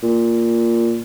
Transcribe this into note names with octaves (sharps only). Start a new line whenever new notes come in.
A#2